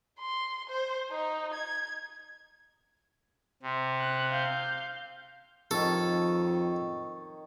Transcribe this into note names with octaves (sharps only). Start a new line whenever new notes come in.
C6
C5
D#4
G#6
C3
F#6
F5 G6
F2 D#3 A4 C#5